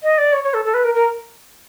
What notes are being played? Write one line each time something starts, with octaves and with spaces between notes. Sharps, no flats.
D#5
D5
C#5
C#5
A4
A4
B4
A#4
A#4